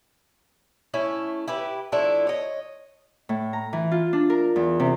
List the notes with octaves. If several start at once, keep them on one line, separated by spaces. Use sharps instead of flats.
A3 C#4 E4
E4 G4 B4
F3 A3 D4 E4
C#5 D#5
A2
A#5
E3
F4
D4
A#4
E2
C3